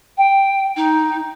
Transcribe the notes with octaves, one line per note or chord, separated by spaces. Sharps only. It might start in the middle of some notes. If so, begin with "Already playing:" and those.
G5
D#4